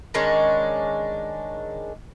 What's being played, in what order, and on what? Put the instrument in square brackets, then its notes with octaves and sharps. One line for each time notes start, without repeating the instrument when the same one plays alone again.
[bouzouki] D#3 G#3 C#4 D4